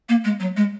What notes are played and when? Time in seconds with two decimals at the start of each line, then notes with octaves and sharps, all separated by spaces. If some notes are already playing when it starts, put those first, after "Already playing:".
0.09 A#3
0.24 G#3
0.40 F#3
0.56 G#3